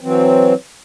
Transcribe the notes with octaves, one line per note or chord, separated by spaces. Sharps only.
E3 F#3 C4